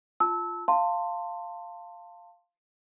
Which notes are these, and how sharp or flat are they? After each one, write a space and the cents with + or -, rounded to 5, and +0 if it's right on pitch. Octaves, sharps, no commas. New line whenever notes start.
F4 +0 A5 +0 E6 -20
F5 +0 A5 +25 C6 +0